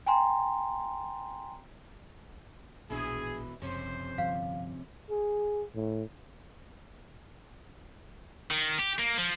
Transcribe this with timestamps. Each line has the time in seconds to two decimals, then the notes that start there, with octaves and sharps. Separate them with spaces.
0.06 G5 G#5 A#5 C6
2.90 A#1 B2 E3 D4 E4 G#4
3.62 F#1 F2 C3 C#4 C5
4.18 G1 F3 F5
5.10 G#4
5.75 A2
8.50 D#3
8.78 G4
8.98 A#3
9.18 F3